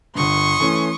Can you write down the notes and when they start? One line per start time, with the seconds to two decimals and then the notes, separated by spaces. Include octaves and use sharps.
0.15 G1 G2 C6 C#6 D#6
0.60 E3 A3 C#4